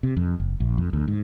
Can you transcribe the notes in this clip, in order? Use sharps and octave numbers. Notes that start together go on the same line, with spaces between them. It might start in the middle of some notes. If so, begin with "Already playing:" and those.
C3
F2
F#1
A#1
F2
D2
G#2